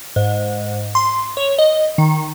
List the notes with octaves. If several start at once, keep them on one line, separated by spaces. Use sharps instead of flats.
G#2
C6
C#5
D#5
D#3